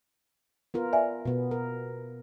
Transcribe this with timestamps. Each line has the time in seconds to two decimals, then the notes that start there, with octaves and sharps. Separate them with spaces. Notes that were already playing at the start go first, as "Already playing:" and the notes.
0.74 B3 F4 A#4
0.93 D5 E5 G#5
1.25 B2 B3
1.51 A#4